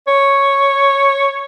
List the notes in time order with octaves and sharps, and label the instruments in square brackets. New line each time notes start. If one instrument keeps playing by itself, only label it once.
[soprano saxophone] C#5